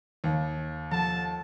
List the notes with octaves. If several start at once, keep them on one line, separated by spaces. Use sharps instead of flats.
D#2
F3 A4 F#5 A5